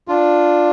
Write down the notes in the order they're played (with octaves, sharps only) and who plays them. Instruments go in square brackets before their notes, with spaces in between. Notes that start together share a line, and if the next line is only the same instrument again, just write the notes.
[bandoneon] D4 F4